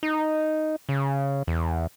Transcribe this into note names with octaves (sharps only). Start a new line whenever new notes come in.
D#4
C#3
E2